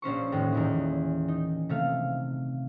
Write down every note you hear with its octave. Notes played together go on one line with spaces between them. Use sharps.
A#1 C#4 C5 C#6
D#2 A2 G#3
E2 A#2 D#3
D#4
C3 A3 F5